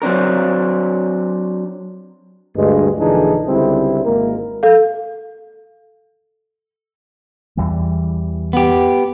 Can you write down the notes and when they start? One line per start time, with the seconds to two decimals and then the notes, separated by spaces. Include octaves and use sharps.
0.02 F#3 C4 D4 A#4
2.56 D2 G2 G#3
2.99 A#1 D3 E3 D4 D#4 G#4
3.47 C#2 D3 G3 C4 E4
4.05 G#1 G#3 A#3 A#4
4.63 A4 F5
7.57 E2 E3 G3
8.53 B3 G4